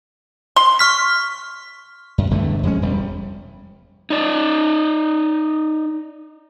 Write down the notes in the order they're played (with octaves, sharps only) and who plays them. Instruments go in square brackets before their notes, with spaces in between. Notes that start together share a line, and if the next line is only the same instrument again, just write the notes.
[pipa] C6
[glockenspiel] C#6 F6 B6
[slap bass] F#2
E1 G2 D3 A3
F2 G#3 C#4
E1 G3
[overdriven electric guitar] D#4 D5